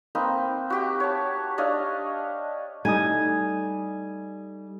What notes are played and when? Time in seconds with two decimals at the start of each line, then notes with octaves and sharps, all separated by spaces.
0.15 A#3 C4 D#4 B4
0.70 F#4 G4 G5
1.00 C#5 A5
1.58 D4 C#5 D#5 F5
2.85 G3 A3 D#4 G#5 D#6